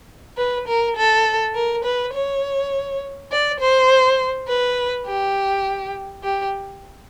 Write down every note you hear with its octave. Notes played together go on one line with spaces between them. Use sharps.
B4
A#4
A4
A#4
B4
C#5
D5
C5
B4
G4
G4